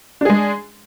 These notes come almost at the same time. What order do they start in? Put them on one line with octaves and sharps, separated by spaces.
D4 G#4 G#3